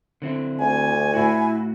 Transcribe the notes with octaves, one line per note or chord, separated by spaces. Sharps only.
D3 C4 E4
D2 G#5
A2 E4 F#4